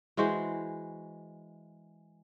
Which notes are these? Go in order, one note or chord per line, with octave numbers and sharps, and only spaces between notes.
E3 G#3 F#4 C5